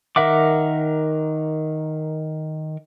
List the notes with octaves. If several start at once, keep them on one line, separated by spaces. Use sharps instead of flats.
D#3 A#4 E5 F#5 D6